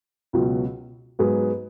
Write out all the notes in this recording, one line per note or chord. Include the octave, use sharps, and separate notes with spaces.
C#2 B2 F#3
G#2 F#3 B3 G#4 B4